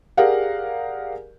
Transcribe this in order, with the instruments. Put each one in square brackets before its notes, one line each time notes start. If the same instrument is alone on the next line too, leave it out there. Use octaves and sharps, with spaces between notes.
[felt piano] G4 G#4 A#4 D5 F5 F#5